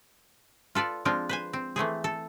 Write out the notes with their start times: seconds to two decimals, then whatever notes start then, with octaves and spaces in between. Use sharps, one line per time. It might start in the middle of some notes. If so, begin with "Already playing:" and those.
0.75 F4 A4 B4 D5
1.05 F3 G#3 C4 D4 F4
1.29 B4 C5 G#5
1.53 C4
1.76 E3 A3 C4 G#4
2.04 A4